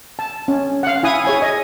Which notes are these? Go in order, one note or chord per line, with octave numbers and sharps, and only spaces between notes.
A5
C#4
F5 F#5
E4 G#5 D#6
G#4 C#5 G#5
D#5